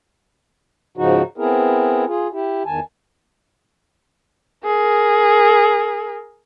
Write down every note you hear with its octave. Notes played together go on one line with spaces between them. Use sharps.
G#2 C#3 F3 D#4 F#4
B3 C4 E4 G#4 A#4
F4 G#4
E4 G4
E2 D#3 G#5 A5
G#4 A#4